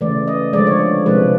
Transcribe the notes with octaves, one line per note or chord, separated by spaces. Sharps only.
C#3 E3 A3 D5
D#5
D3 F3 G#3 D5
C#5
C3 F3 G#3 B4